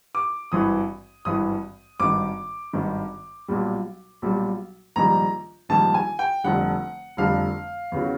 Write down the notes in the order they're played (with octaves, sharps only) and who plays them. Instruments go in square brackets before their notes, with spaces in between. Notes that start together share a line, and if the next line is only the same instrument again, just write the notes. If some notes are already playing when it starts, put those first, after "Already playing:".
[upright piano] D6
G#1 G2 E3 D#6
G#1 G2 E3 D#6
G#1 G2 D#3 D6
G#1 G2 D#3
B1 A#2 G3
B1 A#2 G3
A#1 G#2 D#3 G3 A#5
A#1 G#2 D#3 G3 A5
G#5
G5
F1 F2 D3 G3 F#5
F1 F2 D3 G3 F5
E2 C#3 F#3